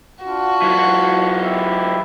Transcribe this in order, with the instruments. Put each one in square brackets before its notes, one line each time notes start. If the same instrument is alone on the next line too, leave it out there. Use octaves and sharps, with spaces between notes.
[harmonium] D4 F4 [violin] F#4
[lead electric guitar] E3 F#3
[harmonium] E4 G4 E5